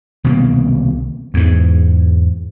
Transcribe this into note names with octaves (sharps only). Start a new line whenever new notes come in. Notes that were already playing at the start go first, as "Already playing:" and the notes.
C2 B2 D#3 A#3
E2 G#2